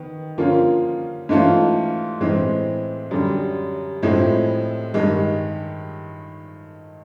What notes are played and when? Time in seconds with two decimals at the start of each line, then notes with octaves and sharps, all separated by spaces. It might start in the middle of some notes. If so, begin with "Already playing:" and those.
Already playing: D#3 B3
0.38 D3 F3 A#3 C#4 F4
1.29 G#2 E3 A3 C#4 F4
2.21 A2 E3 G#3 C4
3.11 F#2 D3 G3
4.03 A2 F3 G#3 C4 E4
4.94 G2 D#3 G#3